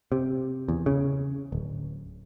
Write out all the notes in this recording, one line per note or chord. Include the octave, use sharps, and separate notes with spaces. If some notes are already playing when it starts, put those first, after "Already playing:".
C3
E2
C#3
D1